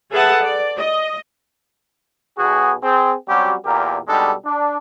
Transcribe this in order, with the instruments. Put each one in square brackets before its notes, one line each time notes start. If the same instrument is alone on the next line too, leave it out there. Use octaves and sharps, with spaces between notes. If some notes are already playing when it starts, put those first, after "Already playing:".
[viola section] G#4 A4 B4 E5 F#5 A5
D5
D#5
[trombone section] B1 B2 F#4 G#4
C4 G#4
F#3 G3 C4 C#4 F#4 G4
E2 A#2 G4 A#4
B2 G3 G#3 D4 D#4 A4
D4